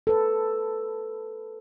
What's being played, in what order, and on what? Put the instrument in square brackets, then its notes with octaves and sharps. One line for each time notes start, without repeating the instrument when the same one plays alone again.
[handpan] A4 B4